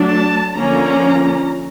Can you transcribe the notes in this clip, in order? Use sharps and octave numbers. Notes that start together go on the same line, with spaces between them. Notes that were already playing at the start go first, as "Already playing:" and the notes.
Already playing: F#3 A3 D4
A5
D3 F3 A#3 C#4 A#5